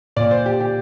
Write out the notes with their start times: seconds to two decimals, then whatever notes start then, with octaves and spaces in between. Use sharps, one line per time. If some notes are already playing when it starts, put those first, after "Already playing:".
0.16 A#2 D5
0.31 C5
0.46 G4
0.60 G4